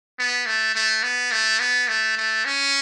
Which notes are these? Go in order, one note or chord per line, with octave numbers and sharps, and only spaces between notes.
B3
A3
A3
B3
A3
B3
A3
A3
C#4